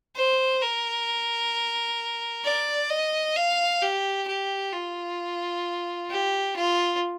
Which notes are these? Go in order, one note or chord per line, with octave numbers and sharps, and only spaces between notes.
C5
A#4
D5
D#5
F5
G4
G4
F4
G4
F4